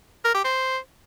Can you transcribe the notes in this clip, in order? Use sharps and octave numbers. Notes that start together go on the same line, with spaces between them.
A#4
G4
C5